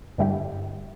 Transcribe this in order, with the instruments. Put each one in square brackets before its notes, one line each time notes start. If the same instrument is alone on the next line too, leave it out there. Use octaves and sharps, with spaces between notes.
[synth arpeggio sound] G2 D3 G3 E4 G4